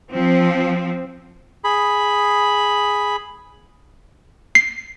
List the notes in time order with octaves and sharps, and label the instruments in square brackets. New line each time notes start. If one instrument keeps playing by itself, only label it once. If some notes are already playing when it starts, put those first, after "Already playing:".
[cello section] F3 C4
[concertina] G#4 B5
[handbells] C7